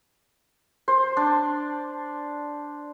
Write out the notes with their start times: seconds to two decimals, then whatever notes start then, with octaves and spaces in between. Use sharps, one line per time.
0.88 C5
1.17 D4